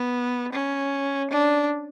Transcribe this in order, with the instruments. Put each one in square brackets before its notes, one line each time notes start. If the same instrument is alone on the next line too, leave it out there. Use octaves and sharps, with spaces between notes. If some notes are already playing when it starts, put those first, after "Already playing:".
Already playing: [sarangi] B3
C#4
D4